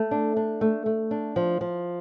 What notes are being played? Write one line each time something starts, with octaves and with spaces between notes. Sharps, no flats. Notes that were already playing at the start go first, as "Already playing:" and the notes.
Already playing: A3
D4
D4
A3
A3
D4
F3
F3